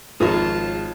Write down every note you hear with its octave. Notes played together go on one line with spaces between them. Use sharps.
G#1 F3 F4 G#4 A#4 C#5 A5